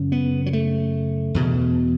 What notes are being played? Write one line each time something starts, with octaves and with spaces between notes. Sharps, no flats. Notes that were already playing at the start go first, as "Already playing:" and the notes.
Already playing: F#2 C#3
B3
F#3
A3
E2 B2